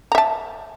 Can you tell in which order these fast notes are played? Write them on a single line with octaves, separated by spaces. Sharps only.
A#5 E5 A5